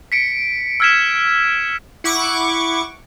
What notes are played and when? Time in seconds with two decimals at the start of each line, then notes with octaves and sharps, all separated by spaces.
0.12 B6 C#7 D7
0.80 E6 F6 G#6 B6 E7
2.04 E4 F#5 C#6 D6